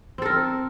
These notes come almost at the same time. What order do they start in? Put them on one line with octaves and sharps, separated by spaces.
C4 A4 A#4